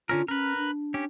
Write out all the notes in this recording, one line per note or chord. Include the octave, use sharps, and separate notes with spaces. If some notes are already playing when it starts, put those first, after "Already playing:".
D3 C#4 F4 A#4
C#4 A#4 B4
D4
C#4 G4